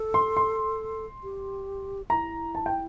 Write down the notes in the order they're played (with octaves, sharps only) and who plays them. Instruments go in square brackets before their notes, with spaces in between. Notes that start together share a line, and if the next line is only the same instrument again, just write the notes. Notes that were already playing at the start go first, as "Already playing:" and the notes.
Already playing: [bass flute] A4
[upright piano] C6
C6
[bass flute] G4
[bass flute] E4 [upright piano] A#5
[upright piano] A5
G5